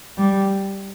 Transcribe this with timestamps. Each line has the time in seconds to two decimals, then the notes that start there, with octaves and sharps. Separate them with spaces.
0.18 G3